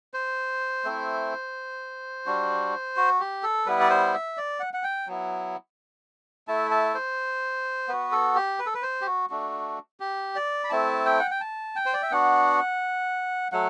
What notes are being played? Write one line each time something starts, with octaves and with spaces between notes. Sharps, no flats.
C5
A3 C4 E4
G3 D4 F#4
F#4
G4
A4
G3 B3 E4 B4
D5
C5
E5
D5
F#5
F#5
G5
F#3 B3 E4
A3 E4 A5
A5
C5
B3 F#4 B4
A4
G4
B4
A4
B4
C5
G4
F#4
A3 D4 F#4
G4
D5
B5
A3 C4 E4 A5
G5
F#5
G5
A5
G5
C5
D5
E5
B3 D4 F#4 F#5
F#3 A3 F#5